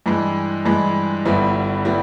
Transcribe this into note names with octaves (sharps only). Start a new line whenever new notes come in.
G2 E3 G#3
G2 E3 G#3
G1 G2 G3 B3 E4
G3 B3 E4